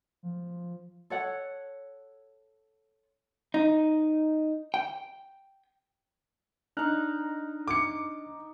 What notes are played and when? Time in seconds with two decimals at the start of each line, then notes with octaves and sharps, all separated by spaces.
0.23 F3
1.10 A4 C#5 F#5
3.54 D#4
4.74 G5
6.77 D4 D#4 A#5 F6 F#6
7.68 D6 C#7